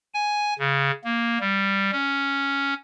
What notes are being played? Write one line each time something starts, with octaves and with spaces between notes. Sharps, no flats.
G#5
C#3
A#3
G3
C#4